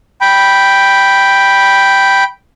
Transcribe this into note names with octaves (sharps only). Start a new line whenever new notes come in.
G5 B5